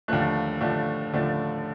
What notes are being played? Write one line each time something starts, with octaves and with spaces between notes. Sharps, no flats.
D#2 D3 F3 A3 F#6
D#2 D3 F3 A3
D#2 D3 F3 A3